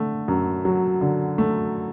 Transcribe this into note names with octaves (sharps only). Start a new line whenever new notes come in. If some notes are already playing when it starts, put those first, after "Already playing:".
Already playing: D3 A3
F#2
F#3
D3
A3